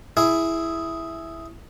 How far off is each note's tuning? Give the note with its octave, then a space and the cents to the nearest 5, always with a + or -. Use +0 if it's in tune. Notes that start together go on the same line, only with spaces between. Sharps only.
E4 +0 G#4 +5